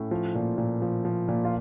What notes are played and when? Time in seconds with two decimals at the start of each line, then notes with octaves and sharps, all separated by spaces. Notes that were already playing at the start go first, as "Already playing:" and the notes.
Already playing: A2 C#4
0.11 F3
0.35 A#2
0.58 A#2
0.82 F3
1.05 F3
1.28 A#2
1.45 F4